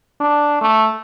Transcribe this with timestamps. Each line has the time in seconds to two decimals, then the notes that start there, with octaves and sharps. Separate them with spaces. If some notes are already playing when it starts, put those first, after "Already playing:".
0.21 D4
0.62 A3